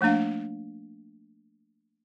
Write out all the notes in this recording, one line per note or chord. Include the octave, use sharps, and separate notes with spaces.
F3 A3 A#3 D4 F5